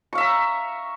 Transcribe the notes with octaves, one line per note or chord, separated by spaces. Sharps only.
E5 F5 A#5 C#6